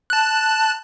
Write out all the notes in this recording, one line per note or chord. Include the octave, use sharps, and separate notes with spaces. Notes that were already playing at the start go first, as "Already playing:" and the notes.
A5 F#6